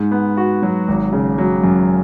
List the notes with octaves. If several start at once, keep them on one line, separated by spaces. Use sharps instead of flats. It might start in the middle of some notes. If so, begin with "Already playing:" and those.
Already playing: G#2
B3
F#4
F#3
G#1
C#3
F#3
F#2